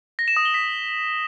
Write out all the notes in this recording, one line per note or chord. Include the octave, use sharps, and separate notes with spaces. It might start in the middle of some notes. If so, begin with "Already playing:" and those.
A#6
E7
D#6
G7
B6